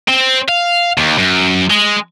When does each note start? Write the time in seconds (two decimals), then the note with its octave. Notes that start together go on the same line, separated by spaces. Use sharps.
0.08 C4
0.49 F5
0.98 D#2
1.18 F#2
1.71 G#3